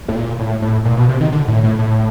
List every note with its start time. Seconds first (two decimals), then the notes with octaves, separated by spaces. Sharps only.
0.08 A2
0.16 A#2
0.39 A2
0.62 A2
0.85 A#2
0.97 B2
1.09 C3
1.20 D#3
1.32 D3
1.48 A2
1.63 A2
1.79 A2